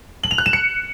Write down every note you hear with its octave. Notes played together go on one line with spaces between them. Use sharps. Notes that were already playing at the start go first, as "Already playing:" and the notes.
F#7
F7
F#6
E7
C#7